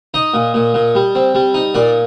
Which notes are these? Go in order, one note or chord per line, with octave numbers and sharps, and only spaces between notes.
D#4 D#5
A#2
A#2
A#2
G3
C4
G3
D#4
A#2 D5